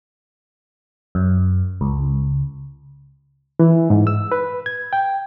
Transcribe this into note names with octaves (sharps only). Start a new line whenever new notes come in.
F#2
C#2
E3
G#2
E6
B4
G#6
G5